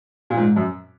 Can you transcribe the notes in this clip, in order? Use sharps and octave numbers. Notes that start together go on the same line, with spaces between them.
A#2
G#2
F#2